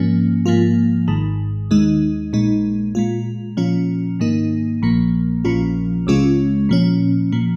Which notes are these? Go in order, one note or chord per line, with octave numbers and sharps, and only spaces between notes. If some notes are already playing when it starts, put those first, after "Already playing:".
Already playing: G#2 F3 A#3 C#4
G#2 F3 A#3 F4
G#1 G#2 D#3
D#2 D#3 G#3 D#4
A#1 A#2 G#3 D#4
A#2 G#3 F4
A#2 F3 C#4 F4
G#2 D#3 A#3 D#4
A#1 A#2 F3 A#3
A#1 A#2 F3 C#4 F4
C#2 C#3 G#3 C#4 F4
A#2 F3 C#4
A#2 F3